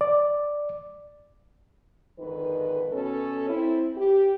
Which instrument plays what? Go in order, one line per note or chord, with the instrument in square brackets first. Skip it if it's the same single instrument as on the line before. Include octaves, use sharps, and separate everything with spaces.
[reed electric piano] D5
[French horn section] F2 G#2 D3 D#3 B4
B2 C#4 A4
C4 E4
G4